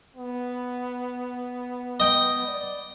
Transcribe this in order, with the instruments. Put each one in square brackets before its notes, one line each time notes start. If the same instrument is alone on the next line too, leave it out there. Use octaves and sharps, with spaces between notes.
[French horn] B3
[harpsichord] D#5 G5
[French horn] D5